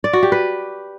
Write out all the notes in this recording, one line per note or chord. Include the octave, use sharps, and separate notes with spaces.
D5
F#4
G4
B4